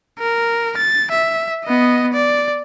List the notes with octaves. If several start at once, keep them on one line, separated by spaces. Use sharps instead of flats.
A#4
A6
E5
B3 D#5
D5